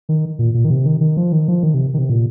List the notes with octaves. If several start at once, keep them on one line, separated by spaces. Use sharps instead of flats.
D#3
A#2
A#2
D#3
C3
D#3
D#3
F3
D#3
F3
D#3
C3
D#3
C3
A#2